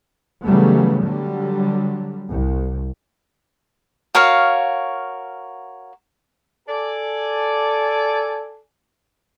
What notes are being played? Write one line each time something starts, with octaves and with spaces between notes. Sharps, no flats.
C#3 E3 F#3 G3 A3 B3
D3 F#3 G3
C2
F#4 A#4 C#5 F5
A4 D5 G#5